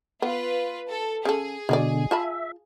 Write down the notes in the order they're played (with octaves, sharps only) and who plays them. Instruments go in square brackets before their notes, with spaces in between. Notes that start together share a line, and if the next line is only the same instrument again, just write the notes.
[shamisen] B3 [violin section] F4 B4
[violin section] A4
[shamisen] C#3 A4 [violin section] G#4
[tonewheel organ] B2 D3 [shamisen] G#3 F#4 D5
[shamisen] F4 A5 B5 [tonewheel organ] E5